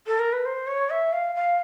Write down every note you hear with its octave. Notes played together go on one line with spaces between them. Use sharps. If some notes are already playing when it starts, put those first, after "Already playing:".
A4
A#4
B4
C5
C#5
E5
F5
F5